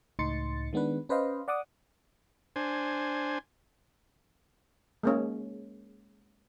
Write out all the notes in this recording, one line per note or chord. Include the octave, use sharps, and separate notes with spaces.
C#2 A2 D#4 C6 A6 C#7
D#3 G#3 B3 D4 B4
C#4 B4 C5 D#5 F5
D5 F#5 D6 D#6
D4 C5 G#5
G#3 A#3 C#4